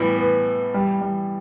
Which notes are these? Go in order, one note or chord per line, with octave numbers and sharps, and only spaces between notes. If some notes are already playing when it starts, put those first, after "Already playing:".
Already playing: A2 E3 G3 B3 E4
B3
G3
G3